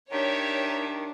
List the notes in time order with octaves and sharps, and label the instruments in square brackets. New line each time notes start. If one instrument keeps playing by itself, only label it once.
[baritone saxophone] D#3 [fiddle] D4 [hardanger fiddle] G4 E5 [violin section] C#5